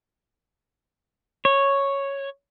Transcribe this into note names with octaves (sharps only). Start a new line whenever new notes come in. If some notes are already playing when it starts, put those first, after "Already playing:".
C#5